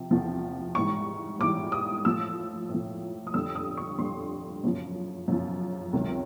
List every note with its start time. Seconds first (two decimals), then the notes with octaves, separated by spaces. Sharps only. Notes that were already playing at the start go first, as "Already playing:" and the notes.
Already playing: C3 F3
0.11 E2 C3 F3
0.75 G#2 E3 G3 C#6
1.39 G#2 E3 G3 D6
1.72 D#6
2.05 A2 F3 E6
2.69 A2
2.74 F3
3.27 D#6
3.34 F2 D3 G3 E6
3.55 D#6
3.77 C#6
3.98 F2 D3 G3 C6
4.64 F#2 C#3 F3
5.28 F#2 C#3 F3
5.93 C#2 C3 D#3 F#3